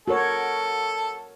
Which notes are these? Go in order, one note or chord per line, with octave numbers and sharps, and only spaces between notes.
F#4 A4 A#4 C#5